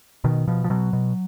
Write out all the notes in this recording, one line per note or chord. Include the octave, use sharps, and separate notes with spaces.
B2 D#3
B2 F3
F3
B2 F#3
B2